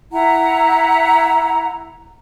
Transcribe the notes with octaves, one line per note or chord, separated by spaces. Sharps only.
E4 F#5 A#5